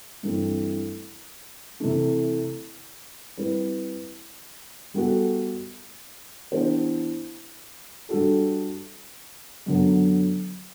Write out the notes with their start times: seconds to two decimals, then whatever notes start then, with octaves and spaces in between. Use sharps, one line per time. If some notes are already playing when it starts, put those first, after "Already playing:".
0.23 G2 E3 A3 C4
1.80 C3 E3 A3
3.37 G3 C4 E4 B4
4.94 G3 B3 F#4 A4
6.52 E3 B3 D4 G4 C5
8.09 G3 D4 F#4 A4
9.66 F#2 D3 F#3 B3